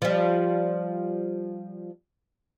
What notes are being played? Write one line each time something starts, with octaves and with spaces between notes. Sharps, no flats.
F3 G3